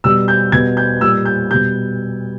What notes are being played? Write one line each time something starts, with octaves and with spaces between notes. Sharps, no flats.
B2 G3 E6
G6
B2 G3 G#6
G6
A#2 G3 E6
G6
B2 G3 G6